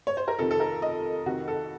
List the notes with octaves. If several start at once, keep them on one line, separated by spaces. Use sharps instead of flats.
C#5
C5
A#4
F2 C3 D#3 A4
A4
A#4
D#5
F2 C3 D#3 F#4
A4